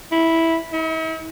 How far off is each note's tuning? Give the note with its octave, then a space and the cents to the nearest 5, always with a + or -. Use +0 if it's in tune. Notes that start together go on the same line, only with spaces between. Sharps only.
E4 -5
E4 -45